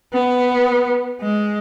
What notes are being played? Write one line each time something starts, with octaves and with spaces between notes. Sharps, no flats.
B3
G#3